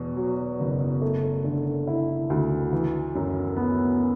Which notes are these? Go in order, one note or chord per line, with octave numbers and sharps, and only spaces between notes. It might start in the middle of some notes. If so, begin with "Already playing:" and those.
Already playing: E2 B2
F#3
F#1
A3
D3
E4
D2
E3
F#2
B3